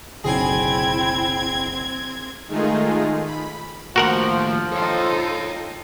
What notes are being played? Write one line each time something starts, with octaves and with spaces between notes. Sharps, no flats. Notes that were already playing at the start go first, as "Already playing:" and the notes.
F#1 B1 D3 C4 E4 G#4 G5 G#6
D#3 G#3 A3 D#4 F4 G#4
B5
D#2 A2 F3 F#4 A#4 F#5
D#4 F4 A4 C#5 G5